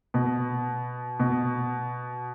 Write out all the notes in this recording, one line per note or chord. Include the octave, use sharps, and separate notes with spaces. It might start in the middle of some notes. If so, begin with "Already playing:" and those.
B2
B2